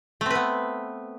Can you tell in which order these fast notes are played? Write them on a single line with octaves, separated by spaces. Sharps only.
A3 C4 B4 B3